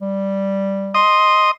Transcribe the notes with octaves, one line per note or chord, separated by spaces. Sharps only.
G3
D#5 C6 D#6